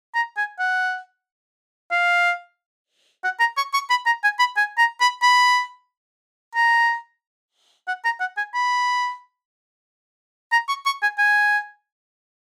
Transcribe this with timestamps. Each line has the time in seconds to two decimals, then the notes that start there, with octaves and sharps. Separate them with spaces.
0.15 A#5
0.37 G#5
0.59 F#5
1.91 F5
3.24 F#5
3.40 A#5
3.57 C#6
3.74 C#6
3.90 B5
4.06 A#5
4.24 G#5
4.39 B5
4.57 G#5
4.78 A#5
5.01 B5
5.22 B5
6.55 A#5
7.88 F#5
8.05 A#5
8.20 F#5
8.37 G#5
8.54 B5
10.52 A#5
10.68 C#6
10.86 C#6
11.02 G#5
11.18 G#5